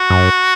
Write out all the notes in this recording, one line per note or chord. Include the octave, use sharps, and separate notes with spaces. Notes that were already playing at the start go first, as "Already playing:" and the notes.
Already playing: F#4
F#2